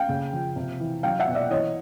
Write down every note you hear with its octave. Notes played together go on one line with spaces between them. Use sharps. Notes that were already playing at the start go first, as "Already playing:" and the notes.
Already playing: F5 G5
C#3
F3
C3
E3
F#3 F5 G5
E5 F#5
B2
D5 E5
E3 C#5 D#5